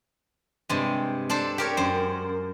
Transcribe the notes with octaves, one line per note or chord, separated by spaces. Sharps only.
G2 C3 G#3
D4 A4 C5
G4 A#4 C#5
F#2 C5